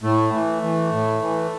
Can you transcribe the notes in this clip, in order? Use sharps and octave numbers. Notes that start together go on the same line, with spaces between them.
A2 A3
E3
E3
A2
E3